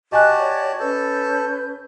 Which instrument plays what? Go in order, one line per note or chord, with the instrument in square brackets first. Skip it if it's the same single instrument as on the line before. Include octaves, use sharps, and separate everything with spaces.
[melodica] F#4 G4 A5 [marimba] D#5 G#5 F#6
[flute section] C#5 D5
[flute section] C#4 B4 G6 [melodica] A4 A5